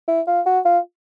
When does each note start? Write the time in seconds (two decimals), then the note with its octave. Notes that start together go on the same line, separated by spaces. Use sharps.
0.08 E4
0.27 F4
0.46 F#4
0.65 F4